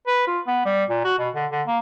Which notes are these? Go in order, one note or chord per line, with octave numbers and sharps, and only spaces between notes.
B4
F4
B3
G3
A#2
F#4
B2
D3
D3
A#3